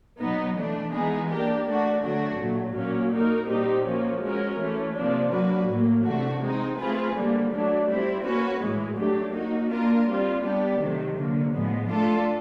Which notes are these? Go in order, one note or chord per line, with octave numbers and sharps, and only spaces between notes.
B2 F#3 B3 D#4
E3 A3 D4
E3 G#3 B3 D#4 G#4
A#3 D4 G4 A#4
A3 D4 F#4
D3 F#3 A3 D4 F#4
A#2 F#3 A3
A#2 F#3 A#3 C#4
A#3 D#4 F#4 A#4
A#2 G3 C4 D#4 G4
F3 A#3 C#4 F#4
G#3 C#4 F#4 A#4
E3 A3 C#4
C3 F3 A#3 D4
F#3 A#3 D4 F#4 B4
A2 F#3 A#3
C3 E3 A3 D4 F#4
G#3 C4 D#4
A3 C4 F4 G#4 B4
D3 G3 A#3
F#3 A3 D4
G3 C4 E4
A#3 C#4 F#4 B4
A2 E3 G#3
F#3 A3 D4 G4
A#3 D#4 F#4
A#3 D4 F4 A#4
G3 C4 F4
G3 B3 D4 G4
C3 D#3 F#3 A3
D3 F#3 A#3
A2 F3 G#3 B3
A3 D4 F4 A4